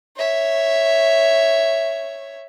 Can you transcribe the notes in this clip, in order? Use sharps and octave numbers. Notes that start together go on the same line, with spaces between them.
C#5 E5